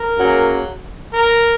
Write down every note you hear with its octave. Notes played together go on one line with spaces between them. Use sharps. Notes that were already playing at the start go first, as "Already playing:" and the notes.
Already playing: A#4
F#2 C#3 F#3 A#3
A#4